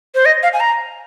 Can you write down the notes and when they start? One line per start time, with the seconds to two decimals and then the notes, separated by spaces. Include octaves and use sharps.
0.15 C5
0.25 D#5
0.43 F5
0.53 G#5
0.60 A#5